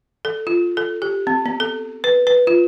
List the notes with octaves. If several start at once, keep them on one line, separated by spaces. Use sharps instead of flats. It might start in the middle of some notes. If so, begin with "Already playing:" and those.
A4
F4
A4
G4
C4
B3
A4
B4
B4
F4